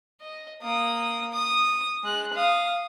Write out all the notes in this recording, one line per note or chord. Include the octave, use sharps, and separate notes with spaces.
D#5
A#3 D#6
D#6
G#3 F#6
F5 D#6